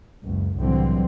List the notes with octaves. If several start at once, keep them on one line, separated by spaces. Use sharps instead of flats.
F#1 C#2
C2 A2 D3 E3 F#3 C4